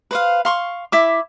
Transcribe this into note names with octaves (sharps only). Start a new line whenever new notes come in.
B4 C5 F5
F5 C6 C#6
E4 E5 D6